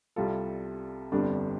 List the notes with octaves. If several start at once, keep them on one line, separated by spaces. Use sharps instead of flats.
C2 C3 G3 F4 A4
G1 F2 D3 G3 D4